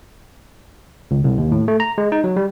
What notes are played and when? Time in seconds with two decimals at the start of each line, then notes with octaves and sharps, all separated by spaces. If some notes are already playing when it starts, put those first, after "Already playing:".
1.11 C#2
1.24 C2
1.38 D#2
1.52 A2
1.68 A3
1.80 A#5
1.98 G#3
2.12 D#4
2.24 F#3
2.37 G3